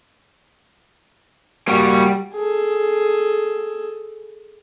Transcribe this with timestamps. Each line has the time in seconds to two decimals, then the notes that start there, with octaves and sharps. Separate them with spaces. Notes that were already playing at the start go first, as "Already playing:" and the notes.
1.68 G3 A#3 F#4
2.34 G#4 A4